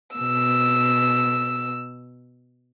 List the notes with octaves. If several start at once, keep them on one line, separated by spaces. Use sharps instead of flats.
B2 E6